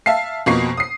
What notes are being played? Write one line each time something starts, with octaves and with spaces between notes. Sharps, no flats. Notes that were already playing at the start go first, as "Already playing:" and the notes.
E5 F5 A5 C7
F2 B2 A#3 C#6 C7
D#6 C7